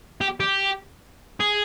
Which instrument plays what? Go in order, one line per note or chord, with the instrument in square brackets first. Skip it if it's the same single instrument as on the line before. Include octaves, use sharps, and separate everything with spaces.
[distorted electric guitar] G4
G4
G#4